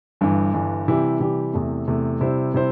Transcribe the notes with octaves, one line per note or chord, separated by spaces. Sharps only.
G1 G2 E3
G1 G2 E3
C3 E3 G3 E4 G4
C3 E3 G3 E4 G4
E2 C3 A3
E2 C3 A3
C3 G3 E4 C5
C3 G3 E4 C5